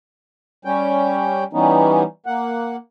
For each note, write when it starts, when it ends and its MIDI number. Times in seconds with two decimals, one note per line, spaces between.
0.65 1.44 55
0.65 1.44 61
0.65 1.44 79
1.53 2.03 52
1.53 2.03 55
1.53 2.03 59
1.53 2.03 61
1.53 2.03 63
2.26 2.76 58
2.26 2.76 78